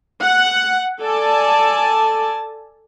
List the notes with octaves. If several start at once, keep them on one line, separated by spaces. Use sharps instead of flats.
F#5
A4 D5 G#5 A5